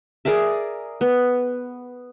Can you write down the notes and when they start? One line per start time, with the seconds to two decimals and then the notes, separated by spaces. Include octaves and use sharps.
0.25 G#4 A#4 D5 E5
1.01 B3